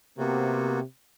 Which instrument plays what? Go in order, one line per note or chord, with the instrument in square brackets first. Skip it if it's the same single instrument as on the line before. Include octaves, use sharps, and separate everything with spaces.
[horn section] C3 [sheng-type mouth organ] A#3 B3 F#4